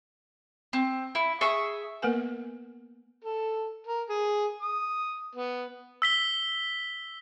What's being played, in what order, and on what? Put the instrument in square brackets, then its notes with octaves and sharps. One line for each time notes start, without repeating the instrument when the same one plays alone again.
[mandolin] C4
E4
G#4 E5 C#6
[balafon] A#3 B3 A#4 B4 G#5
[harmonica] A4
A#4
G#4
D#6
B3
[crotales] E6 B6 G7